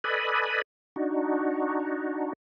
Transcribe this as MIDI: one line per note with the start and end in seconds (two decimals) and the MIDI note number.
0.04 0.62 69
0.04 0.62 71
0.04 0.62 74
0.04 0.62 75
0.04 0.62 80
0.04 0.62 83
0.96 2.33 62
0.96 2.33 63
0.96 2.33 66